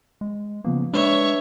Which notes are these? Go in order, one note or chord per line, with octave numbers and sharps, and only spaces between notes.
G#3
C#3 F3 A#3 B3
G#3 D4 B4 C#5 D5 E5